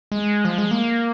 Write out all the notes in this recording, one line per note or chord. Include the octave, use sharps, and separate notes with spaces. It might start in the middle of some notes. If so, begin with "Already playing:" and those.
G#3
F3
G#3
A#3